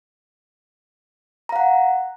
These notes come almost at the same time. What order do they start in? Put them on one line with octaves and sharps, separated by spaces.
A#5 F5 F#5